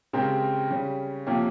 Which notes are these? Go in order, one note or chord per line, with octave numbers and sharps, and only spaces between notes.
C#3 G#3 C4 G4 A#4
C#3 G3 C#4
C3 F3 A#3 C#4 G4